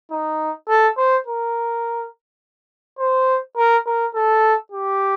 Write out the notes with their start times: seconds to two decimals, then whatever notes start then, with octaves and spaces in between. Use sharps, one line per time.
0.11 D#4
0.69 A4
0.97 C5
1.27 A#4
2.99 C5
3.57 A#4
3.86 A#4
4.15 A4
4.72 G4